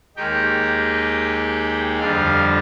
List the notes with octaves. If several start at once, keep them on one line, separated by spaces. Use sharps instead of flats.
D#2 D#3 G#3 D#4 G4 G5
F2 D3 G3 D4 F4 F5